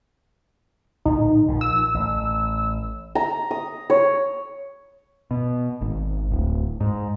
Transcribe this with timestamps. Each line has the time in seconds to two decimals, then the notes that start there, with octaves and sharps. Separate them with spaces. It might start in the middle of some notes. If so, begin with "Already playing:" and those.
1.05 A#1 A2 D3 D#4
1.48 A#1 D3 F3
1.61 E6
1.94 A1
3.15 A#5
3.51 D#6
3.90 C#5
5.31 B2
5.81 G#1
6.32 D1
6.80 G#2